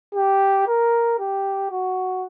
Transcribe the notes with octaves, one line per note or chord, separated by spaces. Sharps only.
G4
A#4
G4
F#4